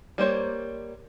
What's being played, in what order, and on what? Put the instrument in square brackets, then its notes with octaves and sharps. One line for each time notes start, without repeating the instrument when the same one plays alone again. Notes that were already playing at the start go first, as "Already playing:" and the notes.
[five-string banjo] G3 A#3 C5 C#5